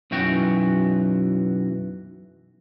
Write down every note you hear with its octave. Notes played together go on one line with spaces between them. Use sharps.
B1 F#2 E3 F#4 G5